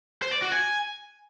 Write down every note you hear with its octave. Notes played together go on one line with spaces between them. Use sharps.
C5
D5
F#4
G#5